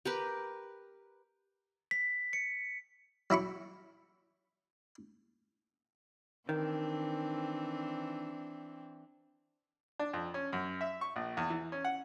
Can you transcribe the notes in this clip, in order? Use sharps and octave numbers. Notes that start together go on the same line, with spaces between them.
G4 A#4 B4
B6
C#7
F#3 E4 B5 C#6
D#3 E3 C4 D4
D4
F2
C#4
F#2
E5
C#6
A#1
E2
E3
C#4
F#5